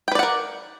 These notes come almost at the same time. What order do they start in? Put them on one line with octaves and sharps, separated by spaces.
G5 B4 D5 F#5 A#4